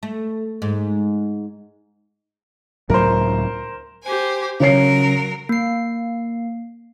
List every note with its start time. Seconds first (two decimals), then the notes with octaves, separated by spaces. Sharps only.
0.03 A3
0.62 G#2
2.90 C#2 A2 F#3 A#4 C5
4.04 G4 C5 G#5
4.60 C#3 F#3 A#4 C#5 C7
5.49 A#3 C7